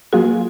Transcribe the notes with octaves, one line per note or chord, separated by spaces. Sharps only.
F#3 A#3 F4 F#4 G#4